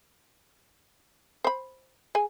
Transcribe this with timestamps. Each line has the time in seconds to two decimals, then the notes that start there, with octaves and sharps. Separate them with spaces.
1.44 C5 B5
2.15 G#4 G#5